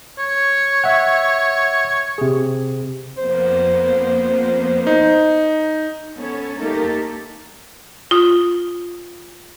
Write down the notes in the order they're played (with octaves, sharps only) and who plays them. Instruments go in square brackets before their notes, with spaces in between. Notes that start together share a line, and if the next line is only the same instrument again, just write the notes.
[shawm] C#5
[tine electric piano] E5 F#5
C3 G#4
[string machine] F2 A#3 B3 [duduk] C5
[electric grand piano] D#4
[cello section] B3 C#4 A4 C#5
A3 A#3 D#4 G4 A4 A#4
[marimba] F4 D#6